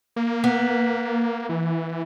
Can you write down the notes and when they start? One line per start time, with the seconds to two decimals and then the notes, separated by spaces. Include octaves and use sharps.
0.16 A#3
0.44 B3
1.49 E3